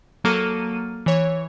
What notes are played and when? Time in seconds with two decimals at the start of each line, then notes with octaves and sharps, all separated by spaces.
0.24 F#3 A#3 A4 F6 D#7
1.06 E3 C#5